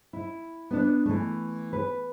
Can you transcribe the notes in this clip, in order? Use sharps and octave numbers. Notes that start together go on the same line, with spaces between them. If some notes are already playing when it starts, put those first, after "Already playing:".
E4
B3 D4
E3 A3
B4